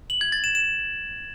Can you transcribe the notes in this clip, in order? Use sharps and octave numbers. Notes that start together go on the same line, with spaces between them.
F#7
G#6
A6
E7
E7